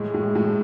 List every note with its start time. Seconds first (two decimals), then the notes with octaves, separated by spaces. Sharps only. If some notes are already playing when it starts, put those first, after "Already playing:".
Already playing: A2 G#3
0.14 A2
0.35 A2